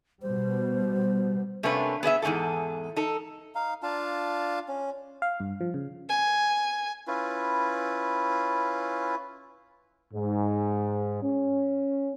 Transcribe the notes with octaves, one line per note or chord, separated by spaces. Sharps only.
B2 G3 C5
C3 A3 A#3 C#4 D4 B4
B3 G#4 D#5 E5
E2 G#2 C#3 G#4 A4
D#4 A4
D#4 F5
D4 F4 F5 A5
C#4
F5
G2
F3
C#3
G#5
C#4 E4 F4 B4
G#2
C#4